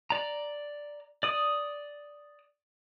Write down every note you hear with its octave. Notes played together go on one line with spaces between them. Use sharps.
D5 A#5
D5 D#6